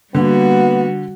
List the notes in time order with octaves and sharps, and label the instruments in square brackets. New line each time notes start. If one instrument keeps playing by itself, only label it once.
[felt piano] D3 [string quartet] G3 F#4 [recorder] A#3 [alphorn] B3